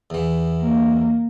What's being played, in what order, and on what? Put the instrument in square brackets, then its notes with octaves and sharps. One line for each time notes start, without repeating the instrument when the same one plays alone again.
[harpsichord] E2 E3
[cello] A#3